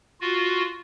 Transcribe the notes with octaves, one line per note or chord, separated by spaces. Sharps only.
F4 F#4